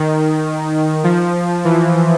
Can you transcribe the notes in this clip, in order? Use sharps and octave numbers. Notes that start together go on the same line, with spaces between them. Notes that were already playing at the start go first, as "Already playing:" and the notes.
Already playing: D#3
F3
E3